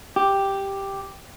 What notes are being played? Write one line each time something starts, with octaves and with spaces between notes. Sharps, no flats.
G4